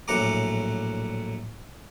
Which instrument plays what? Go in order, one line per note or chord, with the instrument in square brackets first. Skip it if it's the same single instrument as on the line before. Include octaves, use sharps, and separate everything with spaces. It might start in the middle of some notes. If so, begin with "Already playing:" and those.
[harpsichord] A#1 A2 F#3 F#5 A#5 D6